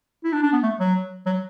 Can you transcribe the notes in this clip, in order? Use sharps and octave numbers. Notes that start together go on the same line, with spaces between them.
E4
D4
D4
B3
A3
F#3
F#3